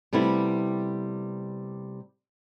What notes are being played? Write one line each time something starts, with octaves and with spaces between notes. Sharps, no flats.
C3 G3 A3 B3 E4